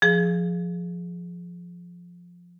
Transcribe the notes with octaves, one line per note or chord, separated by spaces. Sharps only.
F3 G#4